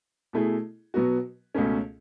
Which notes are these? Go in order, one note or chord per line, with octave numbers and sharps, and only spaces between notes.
B2 A3 E4 G#4
B2 F#3 B3 F#4
C#2 B2 A3 C#4